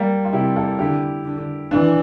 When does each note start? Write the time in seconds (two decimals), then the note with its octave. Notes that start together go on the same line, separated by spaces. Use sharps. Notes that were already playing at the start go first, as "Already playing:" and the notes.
Already playing: G3 A#3
0.25 F4
0.33 C3 E4 G4
0.56 F4 A4
0.79 D3 E4 G4
1.25 D3
1.71 E3 D4 F4